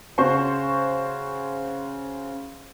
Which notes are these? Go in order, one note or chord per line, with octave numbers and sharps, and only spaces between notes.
C#3 F#4 C5 C#6